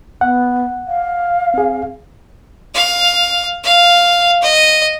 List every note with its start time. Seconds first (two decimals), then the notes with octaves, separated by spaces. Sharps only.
0.21 B3 F#5
0.88 F5
1.54 C4 G#4
2.74 F5
3.64 F5
4.42 D#5